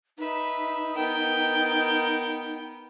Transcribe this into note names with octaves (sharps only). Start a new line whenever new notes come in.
D#4 B4 E5
B3 A#4 G5